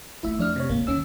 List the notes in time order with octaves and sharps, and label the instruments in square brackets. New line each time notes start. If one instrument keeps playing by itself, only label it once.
[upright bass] A3 A#3 [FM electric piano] E4 E5
[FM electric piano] F2 D4 F6
C3 C#5
[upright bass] D2 G#2 [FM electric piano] A#3
[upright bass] G1 D#2 [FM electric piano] D#3 C#4 E6